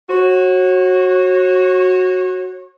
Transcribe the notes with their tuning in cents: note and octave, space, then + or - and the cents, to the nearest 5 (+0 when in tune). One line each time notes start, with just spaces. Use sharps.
F#4 +0 C#5 -35